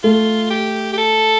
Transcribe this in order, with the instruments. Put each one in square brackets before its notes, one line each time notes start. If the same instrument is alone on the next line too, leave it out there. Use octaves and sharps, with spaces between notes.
[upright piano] A3 [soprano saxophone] F4
[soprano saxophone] G4
G4
A4